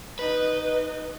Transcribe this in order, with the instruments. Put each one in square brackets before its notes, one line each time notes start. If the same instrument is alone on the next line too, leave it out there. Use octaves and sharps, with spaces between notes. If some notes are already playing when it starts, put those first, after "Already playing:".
[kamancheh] D#4 D#5 [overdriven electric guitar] B4